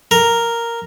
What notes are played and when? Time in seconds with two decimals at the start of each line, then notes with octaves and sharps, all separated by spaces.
0.11 A#4